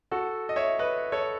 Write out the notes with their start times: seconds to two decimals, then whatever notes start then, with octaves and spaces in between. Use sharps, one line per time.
0.11 F#4 A4
0.49 D#5
0.56 C#5 E5
0.79 B4 D#5
1.12 A4 C#5